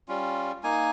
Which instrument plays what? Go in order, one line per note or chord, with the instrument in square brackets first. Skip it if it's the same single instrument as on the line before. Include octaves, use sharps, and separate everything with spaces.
[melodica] G3 C#4 F4
A#3 D#4 G#5